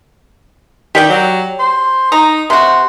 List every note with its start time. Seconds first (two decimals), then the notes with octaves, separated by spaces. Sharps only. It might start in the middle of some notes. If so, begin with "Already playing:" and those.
0.95 D#3 G4 D5 G5
1.10 F#3
1.59 C5
2.12 D#4 A#5
2.50 C3 F#4 C5